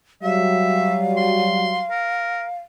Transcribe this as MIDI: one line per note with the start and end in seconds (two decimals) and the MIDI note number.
0.23 1.84 54
0.23 1.84 55
0.23 0.97 76
0.23 2.58 77
1.17 1.82 84
1.90 2.44 70